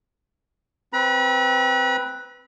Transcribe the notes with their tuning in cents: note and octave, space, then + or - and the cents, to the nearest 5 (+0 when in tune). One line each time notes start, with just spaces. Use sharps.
C4 +0 B4 +0 B5 -45